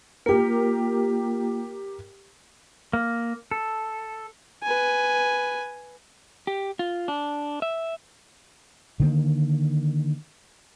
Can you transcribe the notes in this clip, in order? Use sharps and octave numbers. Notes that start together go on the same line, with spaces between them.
A#3 F4 G4 A#4 G5
A#3
A4
B4 G#5
G4
F4
D4
E5
D3 D#3 A#3